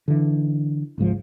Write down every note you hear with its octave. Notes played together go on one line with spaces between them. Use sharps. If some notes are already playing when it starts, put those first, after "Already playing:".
D3 E3
G#1 C#2 G#2 F3